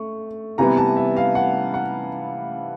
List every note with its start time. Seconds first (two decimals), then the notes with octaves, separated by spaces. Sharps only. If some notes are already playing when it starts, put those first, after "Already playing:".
Already playing: A3 C#6
0.58 C3 E3 G3 B3 A#5
0.77 A5
0.97 E5
1.16 F5
1.35 F#5
1.74 F#5